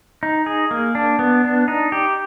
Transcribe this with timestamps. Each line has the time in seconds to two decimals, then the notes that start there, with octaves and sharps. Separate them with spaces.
0.23 D#4
0.46 G#4
0.71 A#3
0.95 D4
1.19 B3
1.45 D4
1.68 D#4
1.92 G4